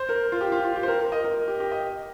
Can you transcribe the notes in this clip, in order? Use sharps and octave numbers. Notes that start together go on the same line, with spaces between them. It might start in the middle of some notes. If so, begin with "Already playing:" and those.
Already playing: C5
A#4
F4
G4
F4
F4
G4
C5
A#4
A#4
D#5
A#4
G4
G4
D#5